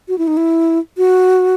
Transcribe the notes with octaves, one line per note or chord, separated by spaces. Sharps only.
F#4
E4
D#4
E4
F#4